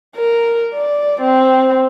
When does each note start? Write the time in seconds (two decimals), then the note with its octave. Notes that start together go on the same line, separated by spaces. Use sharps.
0.16 A#4
0.74 D5
1.21 C4